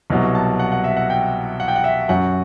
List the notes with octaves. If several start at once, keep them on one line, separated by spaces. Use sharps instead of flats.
C2 B2 F#3
A5
F#5
F#5
E5
F#5
G5
F#5
G5
F#5
E5
F#2 F#3 F#5